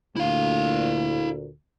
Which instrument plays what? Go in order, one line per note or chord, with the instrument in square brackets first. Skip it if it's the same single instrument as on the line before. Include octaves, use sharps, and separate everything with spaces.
[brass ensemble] D2 A#2 [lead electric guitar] E4 F5